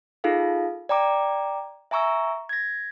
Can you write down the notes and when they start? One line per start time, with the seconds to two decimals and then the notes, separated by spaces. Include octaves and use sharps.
0.24 D#4 F4 G#4 A4 F5
0.89 D5 G5 A#5 D6
1.91 E5 G#5 A#5 C#6 E6
2.49 G#6 A#6